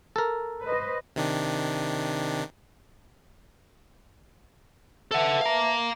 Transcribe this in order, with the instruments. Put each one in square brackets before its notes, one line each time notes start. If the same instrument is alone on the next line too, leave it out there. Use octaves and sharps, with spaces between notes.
[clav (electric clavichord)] A4 A#4
[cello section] B4 C5 D#5
[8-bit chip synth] C3 D#3 D4
[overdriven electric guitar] A4 F#5 [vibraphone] B4 E5 A5
[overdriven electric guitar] F5 A#5